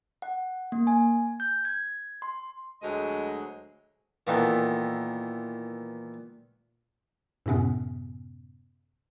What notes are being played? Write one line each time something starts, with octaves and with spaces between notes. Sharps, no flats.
F#5
A#3
G#5
G6
G#6
C6
D2 F#3 G#3 D#5
A#2 D#3 E3 B3 A4
F#2 A2 C3 B3 C#4